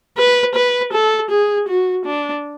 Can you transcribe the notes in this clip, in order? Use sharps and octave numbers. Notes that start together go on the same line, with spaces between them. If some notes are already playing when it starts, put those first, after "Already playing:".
B4
B4
A4
G#4
F#4
D4